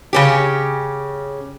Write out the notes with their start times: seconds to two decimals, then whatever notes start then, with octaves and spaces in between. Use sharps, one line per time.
0.13 C#3 C#4 G4